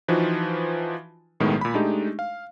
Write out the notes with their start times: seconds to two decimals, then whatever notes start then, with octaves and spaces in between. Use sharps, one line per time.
0.08 E3 F3 D#4 F4 F#4 B4
1.40 B1 A2 D#3 G#3 B3
1.61 A#2 B5
1.74 G#3 A3 D4 D#4 G4
2.19 F5